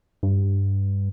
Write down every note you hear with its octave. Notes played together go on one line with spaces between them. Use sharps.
G2